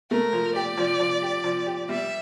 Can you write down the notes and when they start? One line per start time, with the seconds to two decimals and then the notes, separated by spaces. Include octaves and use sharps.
0.11 A3 A#4
0.33 F3
0.55 G4 D5
0.77 F3
1.00 F3
1.22 G4
1.44 F3
1.67 G4
1.89 G3 E5